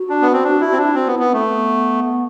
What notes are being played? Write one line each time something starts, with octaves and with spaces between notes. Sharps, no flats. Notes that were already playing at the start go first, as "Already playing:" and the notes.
Already playing: F#4
D4
B3
C4
D4
E4
C4
D4
E4
C4 F#4
B3
E4
B3
A3 C4
B3